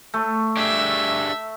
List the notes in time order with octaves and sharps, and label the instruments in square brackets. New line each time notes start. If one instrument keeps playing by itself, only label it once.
[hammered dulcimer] A3
[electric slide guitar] D4 G4 G#4 [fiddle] E5